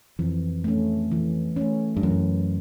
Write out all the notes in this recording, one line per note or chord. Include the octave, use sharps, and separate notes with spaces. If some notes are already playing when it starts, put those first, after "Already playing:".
F2 E3
A3 C#4
E3
A3 C#4
G2
F#2 E3